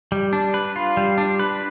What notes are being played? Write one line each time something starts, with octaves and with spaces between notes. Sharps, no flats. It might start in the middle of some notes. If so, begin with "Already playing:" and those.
G3
D4
B4
F4
G3
D4
B4